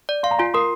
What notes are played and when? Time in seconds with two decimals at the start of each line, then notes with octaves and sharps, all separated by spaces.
0.09 D5
0.23 F5 C6
0.31 A#5
0.39 F4 G#5 C6
0.54 A#4 C6 D#6